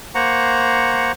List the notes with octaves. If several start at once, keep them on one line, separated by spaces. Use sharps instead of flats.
A#3 C5 F#5 A#5 C#6